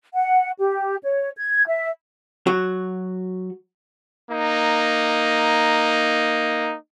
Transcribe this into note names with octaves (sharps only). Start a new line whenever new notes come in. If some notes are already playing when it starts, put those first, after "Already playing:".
F#5
G4
C#5
G#6
E5
F#3 F#4
A#3 D#4